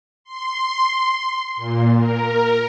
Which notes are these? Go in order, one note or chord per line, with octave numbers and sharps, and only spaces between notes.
C6
A#2
A#4